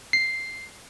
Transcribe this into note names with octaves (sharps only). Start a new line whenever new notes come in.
C7